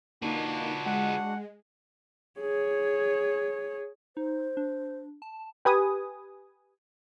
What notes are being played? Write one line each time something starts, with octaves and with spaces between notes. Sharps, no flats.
A#3 D4 D#4 F4 F#4 B4
G#3 F#5
G#4 C#5
D#4 C5
D4
A5
G4 B4 G#5 D#6